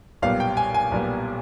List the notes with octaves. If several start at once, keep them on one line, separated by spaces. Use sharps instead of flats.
B1 A#2 G3 B3 F5
G5
G#5
G#5
B1 A#2 G3 B3